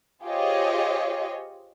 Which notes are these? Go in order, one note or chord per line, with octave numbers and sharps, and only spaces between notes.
F4 G4 G#4 C5 C#5 D#5